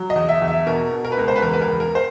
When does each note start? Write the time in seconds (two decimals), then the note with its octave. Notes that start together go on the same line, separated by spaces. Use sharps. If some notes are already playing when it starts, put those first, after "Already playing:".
Already playing: F#3
0.10 D#5
0.16 E2
0.29 E5
0.42 E2
0.48 E5
0.66 B2 A#4
0.91 B2
1.05 A#4
1.12 B4
1.17 C#2 A#4
1.28 C5
1.36 B4
1.42 E2 A#4
1.53 B4
1.61 A#4
1.68 E2
1.80 A#4
1.95 C5